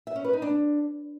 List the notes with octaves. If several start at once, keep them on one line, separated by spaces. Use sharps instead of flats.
E5
C#4
B4
D#4
D4